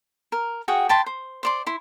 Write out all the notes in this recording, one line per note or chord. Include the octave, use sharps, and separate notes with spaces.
A#4
F#4 G#4 F#5 G5
G5 A5 B5 C6
C5
C5 D5 C6
E4 C6